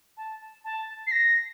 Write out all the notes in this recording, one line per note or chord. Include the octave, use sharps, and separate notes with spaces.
A5
A5
C7
A#6